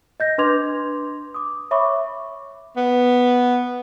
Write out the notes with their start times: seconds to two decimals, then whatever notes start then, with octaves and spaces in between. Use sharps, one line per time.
0.20 D#5 G6 A#6
0.38 D4 B4 C6 D6 G#6 F7
1.34 D6 D#6
1.71 C#5 E5 B5 C#6 D6
2.77 B3